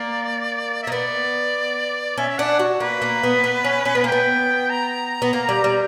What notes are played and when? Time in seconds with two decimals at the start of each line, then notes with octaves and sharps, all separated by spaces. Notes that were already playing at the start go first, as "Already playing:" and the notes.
Already playing: A#3 D5
0.83 E5
0.87 A#3
0.92 B3 D5
2.17 C#4 E5
2.29 E5
2.38 D4 F#5
2.59 F#4
2.80 A#3 B4
3.02 A#3
3.23 B3
3.44 B3
3.64 C#4
3.85 C#4
3.95 B3
4.04 A#3
4.07 B3 G5
4.70 A#5
5.22 B3
5.33 A#3
5.49 G3
5.64 G3